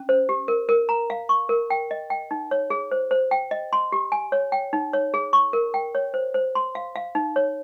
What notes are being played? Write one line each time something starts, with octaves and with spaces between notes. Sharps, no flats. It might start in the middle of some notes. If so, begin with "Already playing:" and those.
Already playing: C#4
C5
G4
A#4
A#4
A#5
F5
C#6
A#4
G5
D#5
G5
D#4
C#5
G#4
C5
C5
G5
D#5
C6
G4
G#5
C#5
G5
D#4
C#5
G#4
C#6
A#4
G5
C#5
C5
C5
C6
F5
F5
D#4
C#5